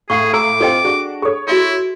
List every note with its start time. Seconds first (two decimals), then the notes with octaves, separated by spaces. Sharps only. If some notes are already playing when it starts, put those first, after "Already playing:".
0.10 A2 G#4 F5 C#6 C7
0.34 A4 A#5 D6 E6
0.61 C4 F4 A4 D#5 G5
0.84 D4 F#4 G#4
1.22 G#4 A4 C#5 C#6
1.48 E4 F#4 E5 C6